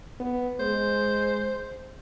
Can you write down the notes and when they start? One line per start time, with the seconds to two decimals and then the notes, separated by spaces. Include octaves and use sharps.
0.20 B3
0.60 G#3 C5